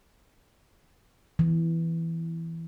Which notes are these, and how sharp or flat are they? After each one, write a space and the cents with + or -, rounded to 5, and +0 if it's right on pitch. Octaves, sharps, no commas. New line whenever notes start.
E3 +0